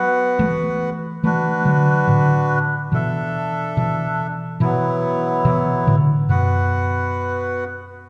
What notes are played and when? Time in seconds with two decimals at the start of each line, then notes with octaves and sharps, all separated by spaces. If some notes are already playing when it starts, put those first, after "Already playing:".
Already playing: F#3 B3 F#4 B4 F#5
0.39 E3 A3
1.23 E3 A3 D4 F#4 B4
1.65 D3 F#3
2.07 A2 D3
2.92 B2 E3 D4 A4 E5
3.77 B2 E3
4.60 B2 E3 F#3 B3 E4
5.45 B2 E3
5.87 A2 D3
6.29 F#2 B2 B3 F#4 B4 F#5